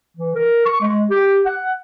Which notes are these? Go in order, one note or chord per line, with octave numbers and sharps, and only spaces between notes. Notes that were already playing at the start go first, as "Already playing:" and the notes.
E3
A#4
C#6
G#3
G4
F#5